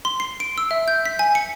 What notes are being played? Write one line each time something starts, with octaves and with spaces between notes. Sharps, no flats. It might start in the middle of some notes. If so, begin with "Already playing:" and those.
C6
C7
D7
E6
E5
G6
B6
G#5
C#7